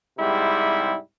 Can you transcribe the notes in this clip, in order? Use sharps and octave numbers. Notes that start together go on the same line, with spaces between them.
G#2 C3 G3 G#3 E4